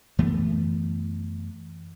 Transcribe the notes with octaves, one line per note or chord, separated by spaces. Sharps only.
F#2 E3 A3 B3